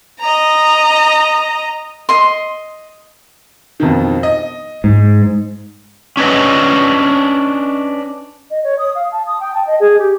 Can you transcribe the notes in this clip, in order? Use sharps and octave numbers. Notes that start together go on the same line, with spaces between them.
D#5 A#5
D#5 C6
F2 B2 D#3
D#5
G#2
C#4 D4 B4 D#5
D#5
C#5
D#6
F5
A5
D#6
G5
A5
D#5
G#4
G4